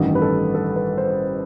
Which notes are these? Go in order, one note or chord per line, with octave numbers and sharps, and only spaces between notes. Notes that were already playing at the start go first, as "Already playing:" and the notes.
Already playing: A1 G2 D#3 G3
B4
A4
A4
B4
C5